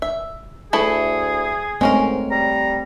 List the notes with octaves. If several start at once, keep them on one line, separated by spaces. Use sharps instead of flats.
E5
D2 A3 E4 G#4 A4
G#2 G#3 A3 C4 C#4 A#4
G3 A#5